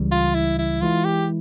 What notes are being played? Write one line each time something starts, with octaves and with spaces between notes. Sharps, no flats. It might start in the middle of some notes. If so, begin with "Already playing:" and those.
Already playing: C#2 C#3 E3 G3
F4
E4
E4
E3 G#3 E4 F4
G4